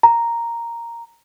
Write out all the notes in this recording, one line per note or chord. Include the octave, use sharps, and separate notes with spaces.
A#5